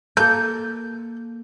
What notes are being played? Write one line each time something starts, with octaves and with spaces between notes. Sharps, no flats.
A#3 A4 G6